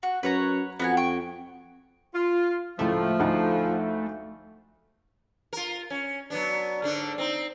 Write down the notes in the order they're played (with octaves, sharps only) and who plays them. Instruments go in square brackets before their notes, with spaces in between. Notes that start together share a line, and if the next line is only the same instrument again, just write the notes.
[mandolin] F#4
[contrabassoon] F#2 [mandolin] B4 C#5 A#5
[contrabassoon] F2 [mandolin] B3 F#4 G#5
[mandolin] G5 C#6
[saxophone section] F4
[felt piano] C#2 A2 [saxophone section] F3 [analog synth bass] A3
[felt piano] D2 D#4 F#5
[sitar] F4 A#4
C#4
F#3 B3 D4
G#2 D3 D4
C4 D#4